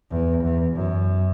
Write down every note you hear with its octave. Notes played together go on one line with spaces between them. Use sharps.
E2
E2
F#2